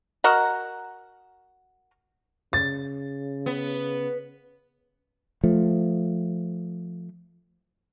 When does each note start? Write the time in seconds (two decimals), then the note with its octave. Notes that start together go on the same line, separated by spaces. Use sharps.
0.24 F#4 A#4 D#5 F#5
2.53 C#3 A6
3.46 B3
5.44 F3 A3